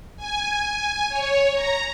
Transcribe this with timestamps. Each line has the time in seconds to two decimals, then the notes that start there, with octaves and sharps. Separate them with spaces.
0.17 G#5
1.09 C#5
1.53 A#5